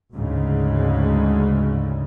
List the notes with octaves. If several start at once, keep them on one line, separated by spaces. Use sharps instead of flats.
D2 G#2 C#3